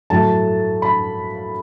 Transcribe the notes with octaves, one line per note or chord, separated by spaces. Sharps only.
A2 F#3 A3 A5
B5